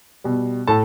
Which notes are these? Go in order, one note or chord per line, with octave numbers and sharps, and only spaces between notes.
B2 G3
A2 A4 A5